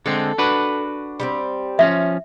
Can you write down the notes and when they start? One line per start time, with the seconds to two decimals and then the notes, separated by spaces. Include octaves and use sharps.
0.06 D3 G#3 C4 A4
0.38 D4 F#4 B4
1.20 G3 B3 C4
1.79 F3 C#4 E5